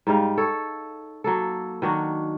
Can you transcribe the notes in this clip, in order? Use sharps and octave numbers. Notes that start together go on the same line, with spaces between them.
G#2 G3 D#4 F5
A4 C#5
F#3 A#3 A4
D#3 F#3 D4 F#4